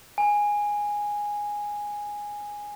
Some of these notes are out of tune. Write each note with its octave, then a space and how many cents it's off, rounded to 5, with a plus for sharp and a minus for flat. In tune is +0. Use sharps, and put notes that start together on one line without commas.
G#5 -10